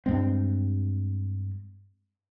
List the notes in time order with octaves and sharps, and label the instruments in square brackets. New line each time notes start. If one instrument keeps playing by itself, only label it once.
[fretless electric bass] G2 G#3 C4